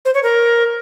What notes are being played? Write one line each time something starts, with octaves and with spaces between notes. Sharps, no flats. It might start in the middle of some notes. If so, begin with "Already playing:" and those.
C5
C#5
A#4